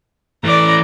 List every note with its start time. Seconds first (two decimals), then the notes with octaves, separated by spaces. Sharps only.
0.44 E3 A3 D5 A#5